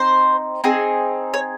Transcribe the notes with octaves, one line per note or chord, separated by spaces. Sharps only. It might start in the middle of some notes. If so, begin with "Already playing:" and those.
Already playing: C4 D#4 C5
C4 D#4 G#4
C#5